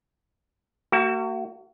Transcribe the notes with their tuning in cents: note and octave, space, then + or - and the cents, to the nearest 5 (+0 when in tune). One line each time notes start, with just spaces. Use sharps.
A#3 -40 F#4 +25